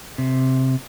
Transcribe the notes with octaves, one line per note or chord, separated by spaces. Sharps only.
C3